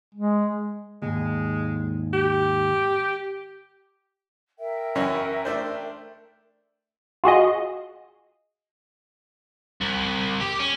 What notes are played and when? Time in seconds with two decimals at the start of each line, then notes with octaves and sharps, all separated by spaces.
0.15 G#3
1.02 D#2 G#2 G#3
2.14 G4
4.58 A#4 E5 G5
4.95 F#2 E3 C#4
5.45 A3 D4 C5
7.24 F4 F#4 G#4 D#5
9.81 C2
10.41 G4
10.60 C#4